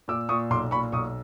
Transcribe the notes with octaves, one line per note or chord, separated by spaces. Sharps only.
A#2 D6 E6
A#2 C#6 D#6
B1 C6 D6
A#2 B5 C#6
B1 C#6 D#6